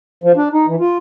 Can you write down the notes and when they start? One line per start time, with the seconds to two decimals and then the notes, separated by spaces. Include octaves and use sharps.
0.24 F3
0.37 D4
0.53 D#4
0.67 E3
0.80 F4